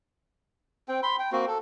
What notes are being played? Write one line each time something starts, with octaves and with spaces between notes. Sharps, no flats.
C4 G5
B5 C6
G5
A#3 C4 F#4
A4